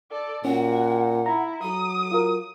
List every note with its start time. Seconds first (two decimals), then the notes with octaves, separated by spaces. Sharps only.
0.11 A4 D5
0.45 A#2 C#4 F#4 F#5
1.26 E4 A#5
1.63 F#3 A4 D#6
2.12 F4 A#4